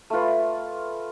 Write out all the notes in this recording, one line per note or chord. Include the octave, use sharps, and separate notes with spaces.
A3 F4 B4